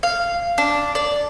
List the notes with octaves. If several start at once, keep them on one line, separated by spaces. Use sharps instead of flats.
F5
D4
D5